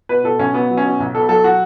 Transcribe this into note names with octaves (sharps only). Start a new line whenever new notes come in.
B2 B4
B2 A4
B1 C#4
B2 B3
F#3
C#4
B2
B1
B2 A4
F#3 A4
F#4